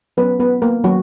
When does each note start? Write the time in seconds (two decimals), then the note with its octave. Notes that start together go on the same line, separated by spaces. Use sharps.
0.17 F#3 B3 B4
0.22 C#4
0.40 B3 B4
0.62 A#3 A#4
0.84 D#3 F#3 A#3 C#4 F#4